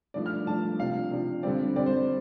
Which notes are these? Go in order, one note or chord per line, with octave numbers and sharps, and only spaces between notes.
G2 F3 A3 D4 D5
F6
G2 F3 A3 D4 A5
C3 F3 D4 F5
C3 F3 D4
G2 D3 G3 C4 D5
G2 D3 G3 C4 D5
C5